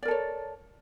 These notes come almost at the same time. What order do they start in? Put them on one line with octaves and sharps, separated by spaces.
D5 A#4 A4 C#5